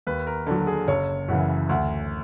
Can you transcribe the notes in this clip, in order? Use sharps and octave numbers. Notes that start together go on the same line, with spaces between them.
D#2 B4
A#4
D3 F#3
G#4
F#1 C#5
F#2 C#3 E3 F#5
D2 F#5